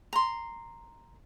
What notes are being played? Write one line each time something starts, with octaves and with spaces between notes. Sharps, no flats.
A#5 C6